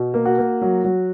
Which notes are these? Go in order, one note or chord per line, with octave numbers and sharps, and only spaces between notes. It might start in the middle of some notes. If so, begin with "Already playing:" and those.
Already playing: B2
A#3
F#4
A#3
F#3
F#3